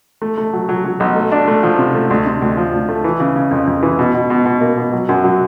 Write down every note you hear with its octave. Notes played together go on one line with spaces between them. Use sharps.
A3
A3
F#3
F#3
F#3
B1
A3
D4
A3
F3
C3
A3
D2
C3
D2
F3
D2
A3
E3
C#3
C#3
F2
F2
E3
B2
B2
B2
B2
A#3
B2
F#3
F#2
F#3